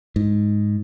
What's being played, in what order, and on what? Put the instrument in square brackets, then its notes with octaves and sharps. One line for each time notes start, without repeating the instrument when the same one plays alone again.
[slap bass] G#2